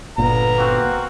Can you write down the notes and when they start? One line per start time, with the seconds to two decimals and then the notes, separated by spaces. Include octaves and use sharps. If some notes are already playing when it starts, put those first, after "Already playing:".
0.18 G1 A#2 B3 A#5
0.58 A#3 C4 F#4